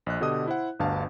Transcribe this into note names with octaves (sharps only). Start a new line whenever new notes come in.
A#1 D#5 F#6
B2 D3 G4 D#5 D#6
E4 C5 F#5
G1 D2 G2 F5 A5